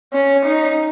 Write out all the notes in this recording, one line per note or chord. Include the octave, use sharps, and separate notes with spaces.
C#4
D#4